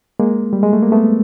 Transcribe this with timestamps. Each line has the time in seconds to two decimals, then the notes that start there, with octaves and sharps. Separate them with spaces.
0.20 G#3 A#3
0.53 G3
0.63 G#3
0.73 A3
0.83 A#3
0.92 A3 B3